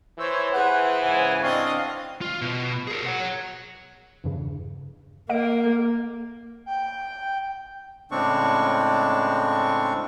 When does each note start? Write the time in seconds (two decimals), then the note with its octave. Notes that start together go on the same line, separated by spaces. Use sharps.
0.19 E3 C5 C#5 E6
0.54 G#4 B4 C5 F#5
1.02 G#2 C#3 G#5
1.42 C4 D4 D#5 F5 C#6
2.21 F4
2.42 B2
2.87 G#4 A#4
3.06 C#5 F#5
4.24 E2 G2 C#3
5.29 A#3 A#4 D#5 F5 D7
6.66 G5
8.11 A2 C#3 G#3 C4 D4 C#6